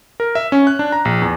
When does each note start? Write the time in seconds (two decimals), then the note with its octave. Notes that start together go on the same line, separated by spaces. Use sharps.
0.20 A#4
0.35 E5
0.52 C#4
0.67 F#6
0.79 D4
0.92 A#5
1.05 A#1
1.22 E2